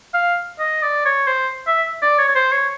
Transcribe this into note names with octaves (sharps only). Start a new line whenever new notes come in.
F5
D#5
D5
C#5
C5
E5
D5
C#5
C#5
C5
C#5